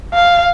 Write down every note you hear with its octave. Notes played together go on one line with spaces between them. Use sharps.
F5